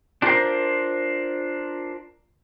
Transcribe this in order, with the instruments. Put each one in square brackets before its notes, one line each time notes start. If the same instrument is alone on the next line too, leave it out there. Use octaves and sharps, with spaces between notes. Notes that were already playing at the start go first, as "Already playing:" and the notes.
[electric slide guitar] D4 F4 F#4 A4 A#4 C5